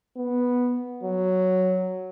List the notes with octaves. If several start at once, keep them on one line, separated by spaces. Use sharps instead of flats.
B3
F#3